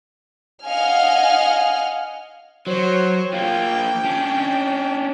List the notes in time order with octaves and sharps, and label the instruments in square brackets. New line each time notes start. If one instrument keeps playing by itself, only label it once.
[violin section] D#5 F5 F#5 G#5 F6
[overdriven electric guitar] F#3 [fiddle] C5 C#5
[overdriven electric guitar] F3 A#3 [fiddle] G5
[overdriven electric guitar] C#4 D4